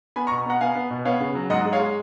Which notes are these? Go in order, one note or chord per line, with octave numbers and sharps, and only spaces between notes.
B3 G#5 B5
A#5 C#6
B2
B3 F#5 A#5
B3 F5 G#5
B3
B2
B3 C#5 F5
C#3
F#3
G#2 D#5 F#5
G#3
C#5 F5
G#3